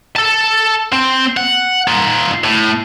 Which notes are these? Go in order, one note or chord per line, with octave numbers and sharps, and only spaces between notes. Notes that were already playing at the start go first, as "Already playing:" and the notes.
A4 A5
C4
F#5
D#4 F4
A2